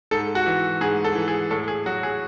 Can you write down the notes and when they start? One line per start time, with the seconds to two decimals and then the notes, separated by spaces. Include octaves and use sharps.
0.11 G#2 A4
0.35 F#4
0.46 E3
0.81 G#2 G#4
1.04 A4
1.15 E3
1.28 G#4
1.51 A2 A4
1.68 G#4
1.86 F#3 F#4
2.03 G#4